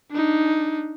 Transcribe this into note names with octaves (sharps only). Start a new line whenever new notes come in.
D4 D#4